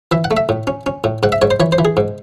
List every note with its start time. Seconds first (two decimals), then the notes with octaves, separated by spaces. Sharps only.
0.11 E3 E5
0.24 F#5
0.31 A3
0.37 E5
0.49 A2
0.67 C#4
0.86 C#4
1.04 A2
1.23 G#2 F#5
1.32 E5
1.42 G#2 C#5
1.51 C5
1.60 E3 C#5
1.72 C5
1.78 E3
1.85 G#4
1.97 G#2